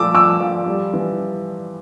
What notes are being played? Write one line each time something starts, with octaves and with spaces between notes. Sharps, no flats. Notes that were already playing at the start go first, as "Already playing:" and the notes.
Already playing: F3 A3 D6 E6
F3 D6 E6
F3
G3
E3